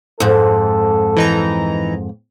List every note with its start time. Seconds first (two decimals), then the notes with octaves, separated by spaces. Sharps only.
0.20 F2 G#2 A4
1.16 E3 D#4 A#5